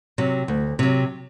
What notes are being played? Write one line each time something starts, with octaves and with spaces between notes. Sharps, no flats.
C3 F#3
D2
C3 F#3